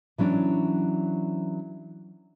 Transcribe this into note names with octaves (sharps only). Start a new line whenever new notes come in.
E3 F#3 C#4 D4